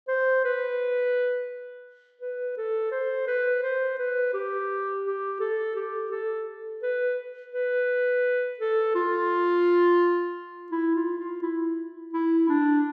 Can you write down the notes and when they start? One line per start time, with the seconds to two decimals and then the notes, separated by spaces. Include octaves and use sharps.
0.08 C5
0.45 B4
2.21 B4
2.57 A4
2.92 C5
3.27 B4
3.63 C5
3.99 B4
4.34 G4
5.04 G4
5.40 A4
5.76 G4
6.11 A4
6.82 B4
7.52 B4
8.60 A4
8.95 F4
10.71 E4
10.95 F4
11.19 F4
11.42 E4
12.13 E4
12.48 D4